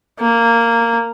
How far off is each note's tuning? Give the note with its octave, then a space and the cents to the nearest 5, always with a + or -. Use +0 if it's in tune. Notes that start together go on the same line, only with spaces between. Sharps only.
A#3 -10